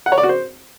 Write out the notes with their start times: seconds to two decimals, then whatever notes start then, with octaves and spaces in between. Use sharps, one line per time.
0.06 F#5
0.12 C#5
0.18 D5
0.23 F#4
0.29 C5